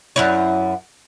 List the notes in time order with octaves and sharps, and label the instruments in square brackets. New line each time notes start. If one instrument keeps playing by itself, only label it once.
[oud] F#2 E4 C#5